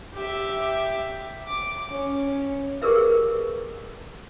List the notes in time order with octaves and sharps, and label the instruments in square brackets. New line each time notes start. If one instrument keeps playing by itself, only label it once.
[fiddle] G4 E5
D6
C#4
[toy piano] G4 G#4 A#4 B4 E5